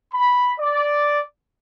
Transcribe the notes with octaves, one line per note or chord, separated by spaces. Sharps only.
B5
D5